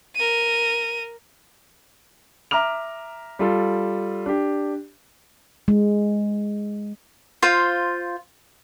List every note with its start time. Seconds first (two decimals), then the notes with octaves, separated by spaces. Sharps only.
0.15 A#4 D#7
2.51 E5 A#5 D6 F6 F7
3.39 G3 F4 A4
4.26 D4 G4
5.68 G#3
7.42 F4 C5 F5